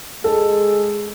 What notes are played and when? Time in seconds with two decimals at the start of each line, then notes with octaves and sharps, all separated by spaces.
0.24 G#3 G#4 A4